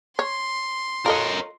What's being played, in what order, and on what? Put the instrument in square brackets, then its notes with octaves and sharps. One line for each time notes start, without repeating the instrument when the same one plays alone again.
[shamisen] C#5 [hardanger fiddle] C6
[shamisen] F4 A4 D#5 [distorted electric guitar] A#4 C#5